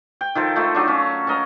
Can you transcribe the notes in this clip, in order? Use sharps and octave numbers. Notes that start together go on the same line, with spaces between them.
G5
D#3 F3 A4
F3 A3 D#4
F#3 D4
C#4
C#4 A#4 D#5 F5